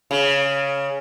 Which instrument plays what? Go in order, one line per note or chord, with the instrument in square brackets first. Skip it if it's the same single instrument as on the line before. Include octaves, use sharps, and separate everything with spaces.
[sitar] C#3